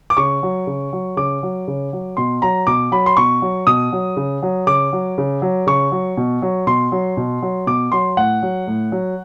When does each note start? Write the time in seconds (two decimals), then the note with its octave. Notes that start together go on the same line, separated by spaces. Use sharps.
0.10 D6
0.17 C#3 C#6
0.43 F#3
0.67 C#3
0.93 F#3
1.17 C#3 D6
1.43 F#3
1.68 C#3
1.93 F#3
2.17 B2 C6
2.42 F#3 A#5
2.67 B2 D6
2.92 F#3 B5
3.06 C6
3.17 B2 C#6
3.42 F#3
3.67 B2 D#6
3.93 F#3
4.17 C#3
4.43 F#3
4.67 C#3 D6
4.93 F#3
5.18 C#3
5.42 F#3
5.67 C#3 C#6
5.92 F#3
6.17 B2
6.42 F#3
6.67 B2 C6
6.92 F#3
7.17 B2
7.42 F#3
7.67 B2 D6
7.92 F#3 C6
8.17 A2 F#5
8.43 F#3
8.67 A2
8.92 F#3